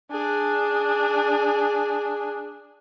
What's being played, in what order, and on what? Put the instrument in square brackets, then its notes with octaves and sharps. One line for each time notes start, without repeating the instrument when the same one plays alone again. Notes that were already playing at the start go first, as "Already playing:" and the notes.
[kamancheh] D4 G#4